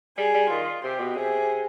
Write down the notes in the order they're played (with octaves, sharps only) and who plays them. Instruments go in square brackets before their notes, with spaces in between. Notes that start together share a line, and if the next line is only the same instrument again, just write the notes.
[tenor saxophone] G3 [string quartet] G#4
[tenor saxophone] G3
[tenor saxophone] D#3 [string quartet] F4
[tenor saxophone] C3 [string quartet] G4
[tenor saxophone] B2
[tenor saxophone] C3 [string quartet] G#4